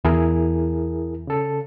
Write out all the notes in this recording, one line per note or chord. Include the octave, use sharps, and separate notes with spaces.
E2 E4 G#4 A#4
C#3 A4